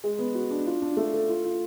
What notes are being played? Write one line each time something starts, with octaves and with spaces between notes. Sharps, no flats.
G#3
B3
F#4
D4
F4
D4
A3
A4
F4
F4